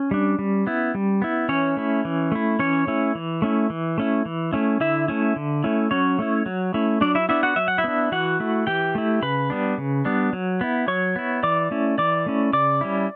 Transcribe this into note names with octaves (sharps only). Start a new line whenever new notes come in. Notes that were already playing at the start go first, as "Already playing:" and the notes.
Already playing: C#4
G3 D4
G3
B3 E4
G3
B3 E4
E3 C#4 C#5
A3 E4
E3
A3 E4
E3 C#4 C#5
A3 C#4 E4
E3
A3 C#4 E4
E3
A3 C#4 E4
E3
A3 C#4 E4
D3 E4 E5
A3 C#4 E4
D3
A3 C#4 E4
F#3 C#4 C#5
A3 C#4 E4
F#3
A3 C#4 E4
F#3 D4 D5
E4 E5
B3 D4 E4 E5
F#4 F#5
F#3 E5
F#5
E4 E5
B3 D4
E3 F#4 F#5
A3 E4
E3 G4 G5
A3 E4
C#3 B4 B5
G3 B3 D4
C#3
G3 B3 D4
F#3
B3 E4
F#3 C#5 C#6
B3 E4
E3 D5 D6
A3 C#4 E4
E3 D5 D6
A3 C#4 E4
C#3 D5 D6
G3 C#4 E4